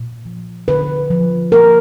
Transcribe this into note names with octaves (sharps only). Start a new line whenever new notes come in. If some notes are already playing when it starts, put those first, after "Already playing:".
Already playing: A#2
F3
D3 B4
F3
A#3 A#4